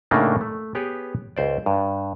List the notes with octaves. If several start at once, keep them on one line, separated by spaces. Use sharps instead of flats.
A2 C#3 A3 A#3 D4 D#4
A3
B3 G4 G#4 B4 C#5
C#2 C5 D5
G2